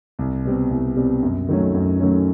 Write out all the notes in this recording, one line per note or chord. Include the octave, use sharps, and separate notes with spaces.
C2
B2 G3 C4
C2
B2 G3 C4
F#2
D#3 F#3 A3 C#4
F#2
D#3 F#3 A3 C#4